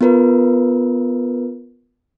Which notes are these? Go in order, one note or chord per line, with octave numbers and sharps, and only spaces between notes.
B3 F4 A#4 B4